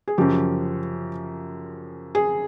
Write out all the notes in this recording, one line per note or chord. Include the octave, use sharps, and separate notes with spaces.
G#4
F#2 C#3 F3 G4
G#4